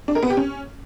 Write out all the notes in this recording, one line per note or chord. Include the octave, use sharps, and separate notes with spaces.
D4
A#4
B3
G4
C#4